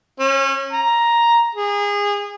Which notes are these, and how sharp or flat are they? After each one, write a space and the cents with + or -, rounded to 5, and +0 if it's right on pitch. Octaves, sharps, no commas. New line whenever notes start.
C#4 -30
A#5 +5
G#4 -25